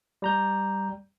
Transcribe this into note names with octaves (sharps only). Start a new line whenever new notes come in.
G3 A#5 G6